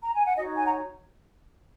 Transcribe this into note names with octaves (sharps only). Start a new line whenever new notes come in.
A#5
G#5
F#5
D#4 F#4 C#5 D#5
G#5
F#5 A#5